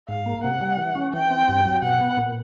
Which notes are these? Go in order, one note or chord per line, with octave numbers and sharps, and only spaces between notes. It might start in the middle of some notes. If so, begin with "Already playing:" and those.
G#2 F5
A#3
C3 F#5
G3
E3
C#4
E3 G5
C4
G2
F#3
B2 F#5
B3
A#2